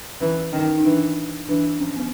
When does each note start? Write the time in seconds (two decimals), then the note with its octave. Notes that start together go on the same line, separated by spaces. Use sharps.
0.21 E3 C#4
0.52 D#3 C#4
0.78 D#4
0.85 E3 D4
1.49 E3 D4
1.80 F3 C#4
1.96 B3